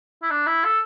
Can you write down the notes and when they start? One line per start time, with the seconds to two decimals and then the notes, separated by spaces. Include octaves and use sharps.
0.22 E4
0.30 D4
0.47 E4
0.64 A4